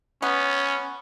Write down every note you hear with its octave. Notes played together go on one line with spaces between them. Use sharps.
B3 C#4